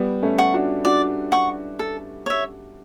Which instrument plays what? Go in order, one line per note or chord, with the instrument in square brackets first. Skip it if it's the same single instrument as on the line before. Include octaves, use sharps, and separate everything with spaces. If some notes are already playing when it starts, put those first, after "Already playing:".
Already playing: [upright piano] G3 B3
A3 C#4
[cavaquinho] F#5 C#6
[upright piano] D4 F#4
[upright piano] D4 F#4 [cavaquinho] D5
[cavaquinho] F#5 C#6
A4
C#5 E5